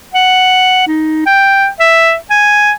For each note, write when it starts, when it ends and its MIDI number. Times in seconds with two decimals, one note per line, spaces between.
0.14 0.86 78
0.87 1.25 63
1.26 1.68 79
1.80 2.15 76
2.30 2.72 80